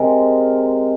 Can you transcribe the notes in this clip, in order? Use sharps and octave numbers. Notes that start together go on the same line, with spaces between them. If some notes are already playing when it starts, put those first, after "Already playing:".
Already playing: C3 G#3 A#4